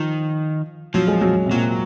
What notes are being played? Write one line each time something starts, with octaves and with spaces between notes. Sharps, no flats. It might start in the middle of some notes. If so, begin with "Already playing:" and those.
Already playing: D#3 F3
F3 F#3
G#3
F#3
C3
A#2 F#3